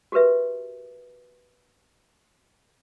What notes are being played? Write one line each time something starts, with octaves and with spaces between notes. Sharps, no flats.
F#4 G4 A#4 B4 E5